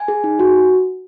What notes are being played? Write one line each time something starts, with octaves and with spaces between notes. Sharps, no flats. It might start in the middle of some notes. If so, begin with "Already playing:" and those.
Already playing: G#5
G#4
D#4
F#4